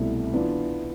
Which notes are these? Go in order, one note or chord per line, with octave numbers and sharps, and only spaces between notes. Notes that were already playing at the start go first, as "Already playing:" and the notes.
Already playing: C2 B2 A3 E4
E3 B3 D4 F4